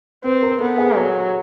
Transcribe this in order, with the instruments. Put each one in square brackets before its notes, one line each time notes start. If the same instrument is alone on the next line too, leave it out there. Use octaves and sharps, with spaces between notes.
[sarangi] C4 [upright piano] B4
[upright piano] A#4
[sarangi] B3 [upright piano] A4
[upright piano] G#4
[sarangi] F#3 [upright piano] G#4